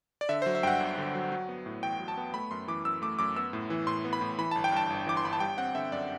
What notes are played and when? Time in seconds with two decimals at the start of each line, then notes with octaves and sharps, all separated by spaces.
0.21 D5
0.29 D3 E5
0.42 F#3 C5
0.55 E5
0.63 G2 G5
0.67 F#5
0.80 G1
0.98 D3
1.15 F#3
1.32 F#3
1.49 B3
1.66 A2
1.83 A1 G5
1.99 F#3
2.08 A5
2.17 B3
2.34 A3 B5
2.51 F#2 C6
2.68 E3 D6
2.85 F#2 E6
3.02 A3 D6
3.19 F#2 D6
3.36 B3 E6
3.53 A2
3.70 E3
3.87 A2 C6
4.05 B3
4.13 B5
4.21 A2
4.38 E3 B5
4.51 G1 A5
4.64 G5
4.72 G2 A5
4.90 G1
5.07 E3 D6
5.17 C6
5.24 G1 B5
5.33 A5
5.40 G3 G5
5.58 C4 F#5
5.75 D3 E5
5.92 F#2 D5